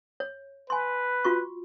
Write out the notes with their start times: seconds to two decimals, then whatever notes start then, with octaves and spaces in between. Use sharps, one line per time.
0.20 C#5
0.70 B4 G#5 C6
1.25 F4 F#4 C#6